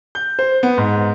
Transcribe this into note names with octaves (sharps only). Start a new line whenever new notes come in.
G6
C5
B3
G#2